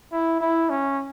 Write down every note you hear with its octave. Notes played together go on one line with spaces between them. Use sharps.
E4
E4
C#4